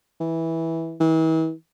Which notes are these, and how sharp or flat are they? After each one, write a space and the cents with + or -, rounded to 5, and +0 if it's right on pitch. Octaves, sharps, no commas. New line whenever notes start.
E3 -10
E3 -40